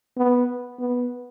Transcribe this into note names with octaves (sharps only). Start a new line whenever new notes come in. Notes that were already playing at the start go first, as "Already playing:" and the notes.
B3
B3